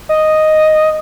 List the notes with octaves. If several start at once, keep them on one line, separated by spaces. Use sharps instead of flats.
D#5